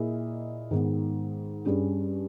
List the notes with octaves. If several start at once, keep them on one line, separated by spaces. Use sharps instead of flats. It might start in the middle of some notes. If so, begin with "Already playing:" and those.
Already playing: A#2 A#3 E4 G#4 D#5
G#2 D#3 G#3 B3
G2 G3 C#4 G#4